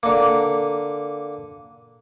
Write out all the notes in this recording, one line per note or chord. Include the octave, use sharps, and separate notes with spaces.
D3 A#3